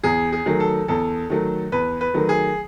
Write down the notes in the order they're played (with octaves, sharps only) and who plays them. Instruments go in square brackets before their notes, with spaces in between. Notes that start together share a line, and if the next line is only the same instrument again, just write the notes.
[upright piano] E2 [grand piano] G#4
[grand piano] G#4
[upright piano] D#3 F#3 A3
[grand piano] A4
[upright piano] E2 [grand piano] A4
[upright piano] D#3 F#3 A3
[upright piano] E2 [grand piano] B4
[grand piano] B4
[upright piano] D#3 F#3 A3
[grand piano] G#4